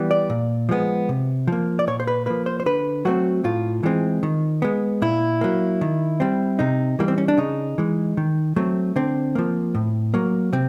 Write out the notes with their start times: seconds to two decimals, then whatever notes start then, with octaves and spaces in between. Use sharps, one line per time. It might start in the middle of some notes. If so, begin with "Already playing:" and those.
Already playing: E3 G3 B3
0.11 D5
0.30 A#2
0.69 F3 G#3 B3
1.09 C3
1.47 F3 A#3
1.79 D5
1.87 A#2 C#5
2.00 C5
2.07 B4
2.26 F3 A#3 B4
2.46 C5
2.60 C5
2.66 D3 B4
3.05 F#3 A3 C4 F#4
3.44 A2 F4
3.83 E3 G#3 C4
4.23 D#3
4.62 G#3 B3
5.02 A#2 E4
5.41 F#3 A#3
5.81 D#3
6.20 G3 C4
6.59 C3 D#4
6.99 E3 G3 A#3
7.08 C4
7.18 C#4
7.28 D4
7.37 C#3 D#4
7.78 E3 G#3
8.17 D#3
8.56 F#3 A3 C4
8.96 D3 C4
9.35 F3 A#3
9.75 A2
10.14 F#3 A#3
10.53 C3 C4